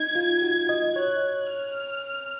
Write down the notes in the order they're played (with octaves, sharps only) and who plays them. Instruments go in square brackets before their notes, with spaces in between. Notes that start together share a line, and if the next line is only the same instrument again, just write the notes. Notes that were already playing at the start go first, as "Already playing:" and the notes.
Already playing: [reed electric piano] D#4 [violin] G#6
[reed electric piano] F4
F#4
D#5
[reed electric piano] C#5 [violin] F#6
[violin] F6